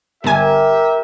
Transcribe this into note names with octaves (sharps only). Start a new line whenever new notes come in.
G1 G4 A#4 E5 G#5